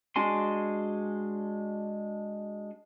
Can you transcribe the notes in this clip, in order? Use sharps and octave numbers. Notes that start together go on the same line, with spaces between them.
G#3 D4 F#4 G#5 C6